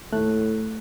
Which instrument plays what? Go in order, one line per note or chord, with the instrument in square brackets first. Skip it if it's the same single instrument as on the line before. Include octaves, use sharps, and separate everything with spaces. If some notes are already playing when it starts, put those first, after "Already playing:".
[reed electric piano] D#2 A3 F#6 [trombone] A2